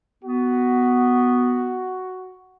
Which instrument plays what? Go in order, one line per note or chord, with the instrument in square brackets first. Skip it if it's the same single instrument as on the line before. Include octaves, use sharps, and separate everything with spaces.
[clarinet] B3 [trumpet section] F#4